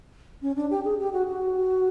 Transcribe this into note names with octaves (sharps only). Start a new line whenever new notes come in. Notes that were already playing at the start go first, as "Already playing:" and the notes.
C#4
D4
G4
G#4
G4
F#4
F#4